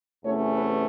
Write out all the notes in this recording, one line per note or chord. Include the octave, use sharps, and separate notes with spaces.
E2 C3 E3 A3 C#4 C#5
B4